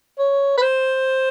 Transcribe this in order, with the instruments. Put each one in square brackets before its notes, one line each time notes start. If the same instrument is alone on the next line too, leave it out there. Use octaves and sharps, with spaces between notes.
[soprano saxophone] C#5
B4
C5